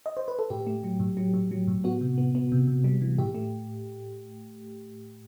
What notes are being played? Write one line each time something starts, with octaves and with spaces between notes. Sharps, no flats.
D#5
C5
B4
A4
A2 G4
A3
F#3
A2
F#3
A2
F#3
A2
B3 F#4
C3
B3
B3
C3
C3
G3
E3
A2 G4
A3